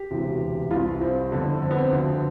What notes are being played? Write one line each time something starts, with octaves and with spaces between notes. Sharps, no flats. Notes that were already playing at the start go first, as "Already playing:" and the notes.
Already playing: G4
E1 D2 C3 E3
C2 C3 E3 F4
C4
G1 F2 D3
C4
B3
C4
D2 D3 F3